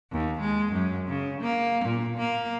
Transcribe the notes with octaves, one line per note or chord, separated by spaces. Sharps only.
D#2
G#3
F#2
C#3
A#3
A#2
A#3